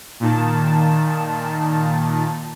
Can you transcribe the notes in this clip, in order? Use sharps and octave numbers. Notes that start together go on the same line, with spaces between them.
A#2 D#3 A5